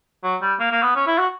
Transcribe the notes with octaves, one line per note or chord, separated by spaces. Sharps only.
F#3
G3
A#3
A#3
B3
C#4
E4
F#4